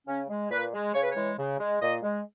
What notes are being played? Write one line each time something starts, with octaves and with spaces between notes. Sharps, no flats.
C#3 C#4
G#3
A#2 B4
G#3
C#3 C#5
B4
C#5
E3 G#3
C#3
G#3
A#2 D#5
G#3